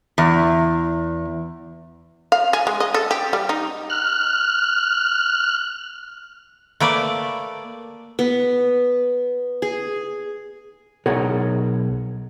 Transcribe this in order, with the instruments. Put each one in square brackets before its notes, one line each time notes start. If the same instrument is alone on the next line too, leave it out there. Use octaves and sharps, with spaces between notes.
[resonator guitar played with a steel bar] E2
[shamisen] F5
G#4
G#3
D#5
A4
G4
G3
D#4
[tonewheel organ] F6 F#6
[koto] A3 A#3 B4 D5
[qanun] B3
G#4
[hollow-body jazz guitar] B1 G#4 A#4 C#5 F#5